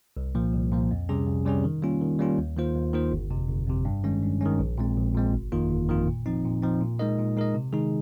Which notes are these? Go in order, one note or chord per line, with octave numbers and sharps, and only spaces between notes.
C2
A#2 F3 A#3
C2
A#2 F3 A#3
F2
C3 G3 C#4 G#4
F2
C3 G3 C#4 G#4
D#3
G3 A#3 C#4 F4
D#3
G3 A#3 C#4 F4
D#2
D#3 A#3 F4 C5
D#2
D#3 A#3 F4 C5
G1
F2 C3
G1
F2 C3
G2
D#3 G#3 C#4
G2
D#3 G#3 C#4
A#1
A#2 G#3 C4
A#1
A#2 G#3 C4
G1
F2 D#3 A#3 F4
G1
F2 D#3 A#3 F4
A#2
F3 C4 D#4
A#2
F3 C4 D#4
A#2
G#3 D#4 A#4 D#5
A#2
G#3 D#4 A#4 D#5
C3
D#3 G#3 D#4 G#4